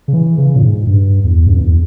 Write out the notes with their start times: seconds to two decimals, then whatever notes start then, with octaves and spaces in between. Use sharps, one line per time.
0.08 C#3
0.13 E3
0.38 C#3
0.56 A#2
0.62 G#2
0.87 G2
1.24 E2
1.47 G2
1.54 F2
1.61 E2